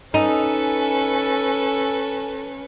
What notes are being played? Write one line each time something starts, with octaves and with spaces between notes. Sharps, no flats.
C#4 D#4 A4 B4 G#5